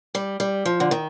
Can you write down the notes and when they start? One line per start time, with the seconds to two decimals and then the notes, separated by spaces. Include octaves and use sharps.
0.15 G3
0.40 G3
0.65 F3
0.80 D3
0.91 D#3